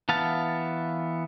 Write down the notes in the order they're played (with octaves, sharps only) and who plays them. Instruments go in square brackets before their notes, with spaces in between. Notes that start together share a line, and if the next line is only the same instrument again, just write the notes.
[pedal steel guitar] E3 B3 F5 A5